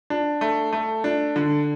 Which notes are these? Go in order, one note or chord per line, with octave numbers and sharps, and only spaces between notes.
D4
A3
A3
D4
D3